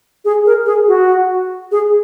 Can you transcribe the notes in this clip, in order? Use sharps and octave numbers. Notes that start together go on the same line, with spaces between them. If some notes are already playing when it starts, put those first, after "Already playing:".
G#4
A#4
G#4
F#4
G#4